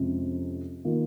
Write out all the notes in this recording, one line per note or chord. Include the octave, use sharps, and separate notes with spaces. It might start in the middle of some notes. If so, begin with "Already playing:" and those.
Already playing: F2 C3 F3 G#3 C#4
D#3 A#3 F4